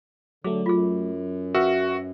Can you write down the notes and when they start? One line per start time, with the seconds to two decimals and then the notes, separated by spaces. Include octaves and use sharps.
0.44 D3 F#3 A3 G#4
0.66 F#2 F4 G#4
1.55 F#4 A#4 B4 E5 G5